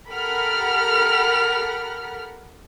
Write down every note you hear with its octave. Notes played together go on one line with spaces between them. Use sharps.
G4 A4 A#4 F#5 B5 F6